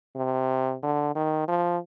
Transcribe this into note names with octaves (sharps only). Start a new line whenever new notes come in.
C3
D3
D#3
F3